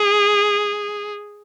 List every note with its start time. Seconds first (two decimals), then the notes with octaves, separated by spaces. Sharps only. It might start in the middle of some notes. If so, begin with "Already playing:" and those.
Already playing: G#4